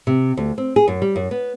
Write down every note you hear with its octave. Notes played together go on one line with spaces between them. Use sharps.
C3
D2
C4
G#4
F#2
G3
F#2
B3